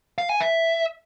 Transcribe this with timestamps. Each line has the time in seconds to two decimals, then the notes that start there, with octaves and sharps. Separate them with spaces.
0.18 F5
0.29 G#5
0.41 E5